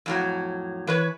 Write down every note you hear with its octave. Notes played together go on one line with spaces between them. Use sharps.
F2 A2 F#3
E3 B4 C#5